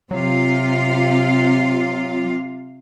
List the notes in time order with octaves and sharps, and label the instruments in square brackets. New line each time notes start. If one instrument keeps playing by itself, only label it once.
[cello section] C3 F4 F5 [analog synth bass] F#3